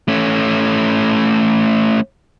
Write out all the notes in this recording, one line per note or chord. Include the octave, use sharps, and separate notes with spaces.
A3 C#4